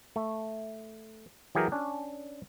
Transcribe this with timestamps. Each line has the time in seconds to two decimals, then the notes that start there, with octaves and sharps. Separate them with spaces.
0.16 A3
1.55 E3 F#3 G4 G#4 A#4
1.72 C#4 D4